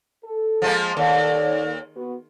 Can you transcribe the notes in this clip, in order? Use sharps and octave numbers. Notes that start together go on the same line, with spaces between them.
A4
F3 G#3 A#3
D#2 A4 C#5 D5
B3 F#4